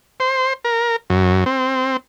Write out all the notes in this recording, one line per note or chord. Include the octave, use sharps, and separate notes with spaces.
C5
A#4
F#2
C4